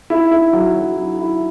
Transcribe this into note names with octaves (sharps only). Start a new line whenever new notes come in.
E4
E4
F#3
F#3
E4
E4